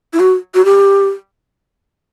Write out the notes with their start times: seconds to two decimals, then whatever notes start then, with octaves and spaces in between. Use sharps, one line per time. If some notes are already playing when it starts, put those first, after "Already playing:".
0.13 E4
0.20 F#4
0.54 F#4
0.65 G4